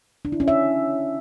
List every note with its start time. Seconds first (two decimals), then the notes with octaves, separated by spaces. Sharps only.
0.25 D4
0.32 E4
0.40 C#4
0.48 E5